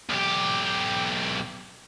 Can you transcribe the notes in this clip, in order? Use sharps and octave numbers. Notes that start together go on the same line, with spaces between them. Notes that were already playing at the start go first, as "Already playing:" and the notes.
B1 G4